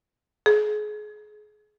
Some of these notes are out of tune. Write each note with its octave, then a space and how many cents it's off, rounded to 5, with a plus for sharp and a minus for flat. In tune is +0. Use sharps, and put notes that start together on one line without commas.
G#4 +30